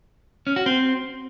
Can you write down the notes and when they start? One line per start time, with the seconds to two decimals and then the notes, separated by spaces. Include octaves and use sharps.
0.47 C#4
0.56 F#4
0.66 C4